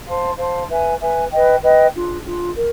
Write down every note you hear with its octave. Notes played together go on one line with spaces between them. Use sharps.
C5 F5 A5 C6
C5 F5 A5 C6
B4 E5 G#5
B4 E5 G#5
B4 D#5 G5
B4 D#5 G5
D4 F4 G#4
D4 F4 G#4
A#4